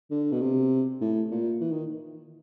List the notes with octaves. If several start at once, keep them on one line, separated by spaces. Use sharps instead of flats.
D3
B2
C3
A2
A#2
E3
D#3